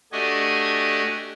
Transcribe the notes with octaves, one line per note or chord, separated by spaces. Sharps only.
A3 D4 F#4 G4 D#5 G#5